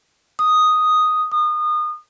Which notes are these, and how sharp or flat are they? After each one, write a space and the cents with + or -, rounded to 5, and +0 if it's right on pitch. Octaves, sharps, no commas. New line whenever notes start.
D#6 +0
D#6 -30